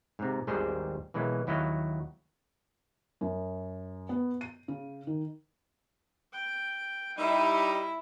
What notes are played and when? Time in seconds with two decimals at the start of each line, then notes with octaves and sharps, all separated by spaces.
0.19 G#2 C3
0.47 G#1 D#2 G3 G#4 C5
1.14 B2 E3 F#3 G#3 A#3
1.47 D#2 F#3 E4 F#4 D#5 F5
3.21 F#2
4.09 B3
4.41 D#7
4.68 C#3
5.07 D#3
6.33 G5
7.18 G3 D#4 E4 E5